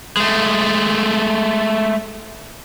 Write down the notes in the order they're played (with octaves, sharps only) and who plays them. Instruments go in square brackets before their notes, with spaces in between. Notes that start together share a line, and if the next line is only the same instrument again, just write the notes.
[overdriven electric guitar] G#3 A3